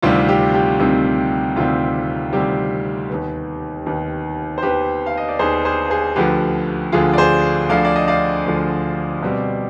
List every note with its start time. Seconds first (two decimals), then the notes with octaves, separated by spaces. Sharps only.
0.02 D2 C3 D#3 G3 C4 F4
0.28 G4
0.54 G4
0.79 D2 C3 D#3 G3 C4
1.56 D2 C3 D#3 G3 C4 F4
2.33 D2 C3 D#3 G3 C4 G4
3.09 D#2 D#3 B3
3.86 D#2 D#3 B3
4.58 C5
4.62 D#2 D#3 B3 G4 B4
5.06 F5
5.17 D#5
5.29 D5
5.39 D#2 D#3 B3 G#4 C5
5.65 G#4 C5
5.90 G#4 C5
6.16 D2 D3 F3 G4 B4
6.92 D2 D3 F3 F4 G#4
7.13 D5
7.18 G#4 C5
7.69 D2 D3 F3 D5 F5
7.85 D5
7.96 D#5
8.08 D5 F5
8.46 D2 D3 F3
9.22 B2 G3 C4